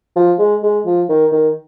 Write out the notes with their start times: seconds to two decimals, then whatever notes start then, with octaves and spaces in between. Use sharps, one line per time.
0.16 F3
0.39 G#3
0.63 G#3
0.86 F3
1.09 D#3
1.32 D#3